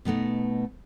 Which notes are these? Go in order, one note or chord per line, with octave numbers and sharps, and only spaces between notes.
B2 A3 B3 D#4